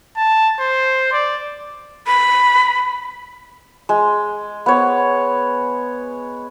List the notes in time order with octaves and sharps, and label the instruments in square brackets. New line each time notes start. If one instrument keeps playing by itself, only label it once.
[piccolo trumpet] A5
C5
D5
[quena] B5
[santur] G#3
B3 C#5